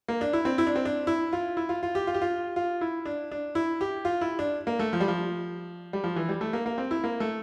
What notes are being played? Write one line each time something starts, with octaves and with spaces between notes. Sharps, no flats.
A#3
D4
E4
C4
E4
D4
C4
D4
E4
F4
E4
F4
F4
G4
F4
G4
F4
F4
E4
D4
D4
E4
G4
F4
E4
D4
A#3
A3
F3
G3
F3
G3
F3
E3
G3
A3
A#3
A#3
C4
E4
A#3
A3